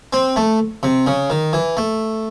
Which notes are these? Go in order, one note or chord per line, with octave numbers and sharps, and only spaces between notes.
C4
A3
C3
C#3
D#3
E3
A3